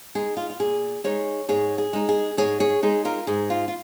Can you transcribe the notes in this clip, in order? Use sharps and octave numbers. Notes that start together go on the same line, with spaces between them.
G#3 D#4 G#4
F4
F4
A#2 G#4
G#3 D#4 G#4 C#5
G#2 G#4 C#5
G#4
G#3 D#4
G#4
G#2 G#4 C#5
G#4 C#5
G#3 D#4 G#4
F4 A#4
G#2 G#4
F4
F4